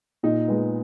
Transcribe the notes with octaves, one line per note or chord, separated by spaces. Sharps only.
A#2 D#4
G#3 B3